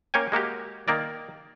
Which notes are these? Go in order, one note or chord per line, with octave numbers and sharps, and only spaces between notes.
A#3 C#4 C#5 G5 G#5
G#3 A#3 F#4 G4
D#3 A#3 A#4 D5